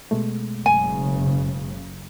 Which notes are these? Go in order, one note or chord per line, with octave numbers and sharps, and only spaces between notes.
B2 G#3 A3
F#1 C#3 G#5